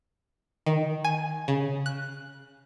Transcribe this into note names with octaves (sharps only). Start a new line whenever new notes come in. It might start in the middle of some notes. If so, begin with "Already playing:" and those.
D#3
G#5
C#3
F#6